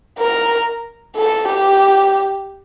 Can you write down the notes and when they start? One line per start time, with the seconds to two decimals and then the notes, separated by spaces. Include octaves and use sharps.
0.18 A#4
1.16 A4
1.48 G4